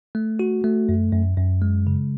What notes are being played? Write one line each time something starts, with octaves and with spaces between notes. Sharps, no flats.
A3
F#4
A3
F#2
F#2
F#2
G#3
C#3